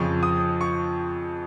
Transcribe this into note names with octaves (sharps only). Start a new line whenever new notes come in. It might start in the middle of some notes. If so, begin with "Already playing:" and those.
Already playing: F2 C#3 F3 C#6
D#6
C#6